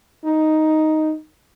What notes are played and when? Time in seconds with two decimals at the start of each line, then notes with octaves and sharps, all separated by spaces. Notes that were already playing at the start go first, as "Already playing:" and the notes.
0.24 D#4